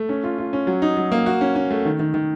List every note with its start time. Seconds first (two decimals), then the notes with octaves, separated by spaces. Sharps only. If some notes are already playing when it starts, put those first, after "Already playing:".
Already playing: A3
0.09 C#4
0.24 F4
0.38 F4
0.53 C#4
0.67 F#3
0.82 D#4
0.97 F#3
1.12 A#3
1.26 F#4
1.41 C#4
1.56 C#4
1.71 A3
1.85 D#3
1.99 D#3
2.14 D#3